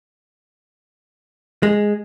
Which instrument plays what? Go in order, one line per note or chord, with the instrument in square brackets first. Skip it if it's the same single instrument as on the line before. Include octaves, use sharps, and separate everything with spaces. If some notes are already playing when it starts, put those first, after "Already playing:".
[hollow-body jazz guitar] G#3